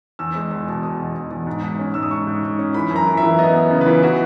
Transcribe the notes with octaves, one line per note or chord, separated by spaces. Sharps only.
E2 E6
G#3
E2
B2
B2 D#6
E2
E2
E2
G#2
G#2
C#4
G#2 E6
D#6
G#2 C#6
G#2
G#2
C#4
E3 B5
F#2
A#5
E3
E5
E3
B3 D#5
B3
C#3
B4
E3
E3 F#4